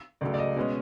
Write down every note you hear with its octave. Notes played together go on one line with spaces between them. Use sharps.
C#2 C#3 F#3 A3 D5
D5
D#5
B2 G#3 C#4